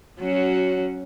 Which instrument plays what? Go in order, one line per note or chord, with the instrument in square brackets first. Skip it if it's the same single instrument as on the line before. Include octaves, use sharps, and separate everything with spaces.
[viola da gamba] F#3 C#4 F#4